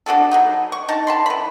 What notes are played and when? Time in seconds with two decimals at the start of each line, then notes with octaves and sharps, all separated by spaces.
0.06 D4 F#4 G#4 A4
0.31 F#3 B3 D#4
0.72 C#6
0.89 D#4 A5
1.07 A5 B5 C6
1.26 E3 B5